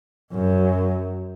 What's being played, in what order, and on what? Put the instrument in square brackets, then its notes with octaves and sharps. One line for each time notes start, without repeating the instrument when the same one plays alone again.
[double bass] F#2